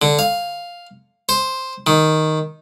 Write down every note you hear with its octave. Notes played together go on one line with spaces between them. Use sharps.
D3
F5
C5
D#3